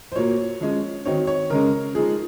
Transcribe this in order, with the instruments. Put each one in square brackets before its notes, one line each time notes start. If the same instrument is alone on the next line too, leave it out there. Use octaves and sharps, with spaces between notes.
[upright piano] C5
A#2 F#3 A#3 C#5
F3 G#3 C#4
D#3 F#3 C4 D#4 C#5
C#5
C#3 G#3 C#4 A#4
F3 G#3 D#4 G#4